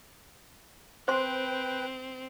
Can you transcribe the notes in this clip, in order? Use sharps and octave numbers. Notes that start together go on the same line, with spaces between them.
C4 B4 C5 G5 C6